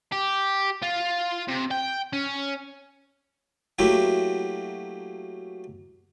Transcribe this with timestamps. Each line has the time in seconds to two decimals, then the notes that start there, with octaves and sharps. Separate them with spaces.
0.12 G4
0.82 F4
1.48 C3
1.71 G5
2.13 C#4
3.79 F#3 A3 A#3 E4 F#4 G4